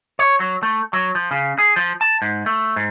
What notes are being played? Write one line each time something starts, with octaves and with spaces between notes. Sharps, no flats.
C#5
F#3
A3
F#3
F3
C#3
G#4
F3
A5
G#2
A3
G#2